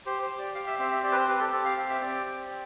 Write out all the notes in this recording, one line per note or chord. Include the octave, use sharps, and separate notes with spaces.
G4 C5
C5
G4
D5
G4 F5
E5
C4 E5
E5
G4 D5
B4
C5
G4 B4
A4
C4 A4
F5
G4 F5
E5
C4 D5
G4
C4